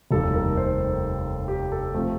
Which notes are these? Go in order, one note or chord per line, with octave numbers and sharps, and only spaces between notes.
F1 D#2 D#3 G3 A4
A#4
C5
G4
A4
C3 F3 A3